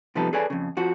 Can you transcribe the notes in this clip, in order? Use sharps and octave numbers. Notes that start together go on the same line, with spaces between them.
C3 F3 G3 B3 D#4 A4
G#4 A4 B4 C#5 D5 G#5
F2 C#3
F2 F3 F#4